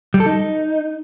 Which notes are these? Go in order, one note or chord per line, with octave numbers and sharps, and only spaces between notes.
G3
A4
D#4